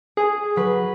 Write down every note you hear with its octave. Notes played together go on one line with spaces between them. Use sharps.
G#4 G#5
F#3 B4